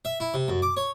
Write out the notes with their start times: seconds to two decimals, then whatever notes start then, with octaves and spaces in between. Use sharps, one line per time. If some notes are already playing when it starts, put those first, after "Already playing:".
0.05 E5
0.20 E4
0.34 C3
0.48 F#2
0.62 D6
0.77 C#5